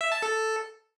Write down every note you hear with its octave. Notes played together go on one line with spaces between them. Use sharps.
E5
A5
A4